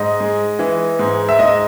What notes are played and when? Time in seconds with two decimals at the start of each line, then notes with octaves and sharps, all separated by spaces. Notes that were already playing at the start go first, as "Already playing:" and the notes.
Already playing: G#2 D#5
0.20 G#3
0.59 E3
0.99 G#2
1.29 E5
1.39 G#2 D#5